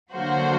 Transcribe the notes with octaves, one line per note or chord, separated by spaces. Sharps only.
D3 F#3 A#3 F#4 C5